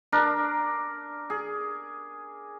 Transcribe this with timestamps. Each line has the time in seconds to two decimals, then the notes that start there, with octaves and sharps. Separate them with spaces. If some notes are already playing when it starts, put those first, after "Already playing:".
0.12 D4 A#4
1.30 G#4